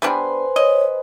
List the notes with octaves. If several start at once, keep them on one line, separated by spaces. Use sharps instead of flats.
G3 B3 D4 B4 C5 G#5
C#5 D#5